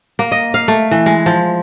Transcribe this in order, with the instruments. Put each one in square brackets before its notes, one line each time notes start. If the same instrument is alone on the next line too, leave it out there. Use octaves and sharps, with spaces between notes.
[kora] A#3
D#5
F5
A3
E3
G#3
F3